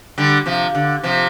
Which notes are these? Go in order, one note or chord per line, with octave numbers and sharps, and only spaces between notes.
D3 G3
C3 F3
D3
C3 F3